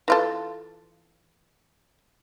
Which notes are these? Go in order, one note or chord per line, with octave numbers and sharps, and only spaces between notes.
E3 F4 A4